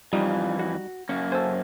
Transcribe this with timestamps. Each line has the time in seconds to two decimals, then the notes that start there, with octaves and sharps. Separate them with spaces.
0.13 F2 E3 G3 D#4 F4
0.59 F#4
1.09 F#2 A#3 C#4
1.32 A4 C5 G#5